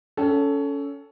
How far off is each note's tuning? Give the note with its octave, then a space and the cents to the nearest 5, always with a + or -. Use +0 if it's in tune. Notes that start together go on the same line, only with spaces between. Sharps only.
C#4 +20 A4 +0 G5 +0